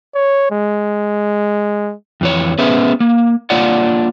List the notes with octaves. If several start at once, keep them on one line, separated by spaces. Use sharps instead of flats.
C#5
G#3
F2 E3 C#5
B3 C#4 G#4 B4 C5 E5
A#3
A#3 D4 F4 C#5 D5 F#5